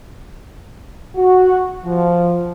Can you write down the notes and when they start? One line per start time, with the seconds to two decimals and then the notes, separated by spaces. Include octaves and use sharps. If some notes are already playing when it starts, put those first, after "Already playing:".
1.15 F#4
1.84 F3